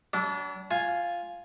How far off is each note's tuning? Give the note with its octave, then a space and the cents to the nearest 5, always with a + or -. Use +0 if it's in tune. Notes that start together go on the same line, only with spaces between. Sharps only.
F#3 +45 D4 -25
F4 +0 G#5 +0